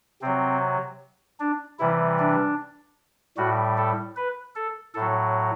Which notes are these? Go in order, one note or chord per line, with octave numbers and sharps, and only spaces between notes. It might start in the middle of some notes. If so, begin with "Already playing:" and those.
C3 F#3 C4
D4
C3 E3 G3 E4
D4
A2 G3 F#4
A4
B4
A4
A2 F#3 A4